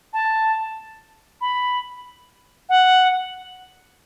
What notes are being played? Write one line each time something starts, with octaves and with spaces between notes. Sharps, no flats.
A5
B5
F#5